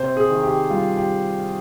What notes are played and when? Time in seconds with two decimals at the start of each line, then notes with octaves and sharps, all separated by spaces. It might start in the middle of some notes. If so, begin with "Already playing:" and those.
Already playing: C3 C5
0.17 G#4
0.30 D#3
0.43 G4
0.70 G3 F4
0.97 G4